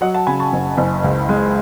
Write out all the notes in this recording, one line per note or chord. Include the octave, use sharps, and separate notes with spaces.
F#3 D#5 F#5
F#5 A5
C#3 G#5 B5
A5 C#6
F#1
F#1
C#2
G#3